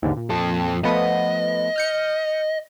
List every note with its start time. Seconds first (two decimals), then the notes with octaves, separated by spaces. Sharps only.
0.02 D#2 G#2 D3
0.17 A#2
0.30 F2 A4
0.84 F3 A3 B3 D#5
1.76 F6 G6 C#7